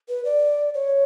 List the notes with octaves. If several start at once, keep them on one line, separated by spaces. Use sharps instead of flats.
B4
D5
C#5